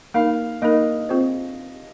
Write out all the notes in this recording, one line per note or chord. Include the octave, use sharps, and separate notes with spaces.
A#3 D#4 A#4 F5
A#3 D#4 A#4 D#5
C4 F4 G#4 C5